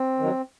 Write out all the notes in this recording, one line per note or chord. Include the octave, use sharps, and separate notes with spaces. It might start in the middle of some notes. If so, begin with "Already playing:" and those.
Already playing: C4
D#3 F#3